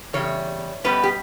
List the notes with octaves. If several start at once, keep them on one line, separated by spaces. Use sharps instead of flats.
E2 C#3 G3 C#5
B2 G3 B3 C#4 B4
G4